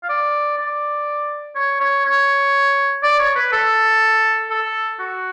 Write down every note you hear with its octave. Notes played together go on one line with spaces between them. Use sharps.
F5
D5
D5
C#5
C#5
C#5
D5
C#5
B4
A4
A4
F#4